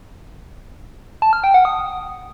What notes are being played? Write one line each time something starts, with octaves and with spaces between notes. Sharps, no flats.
A5
F6
G5
F#5
D#6